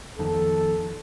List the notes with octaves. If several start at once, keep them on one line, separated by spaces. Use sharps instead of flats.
F2 D#3 A4